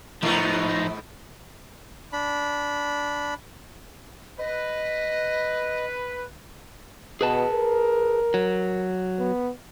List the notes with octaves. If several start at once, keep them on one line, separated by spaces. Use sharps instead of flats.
G#2 F3 B3 D#4
D4 B5
B4 D#5
B2 G#4 B4 A5
A#4
F#3
B3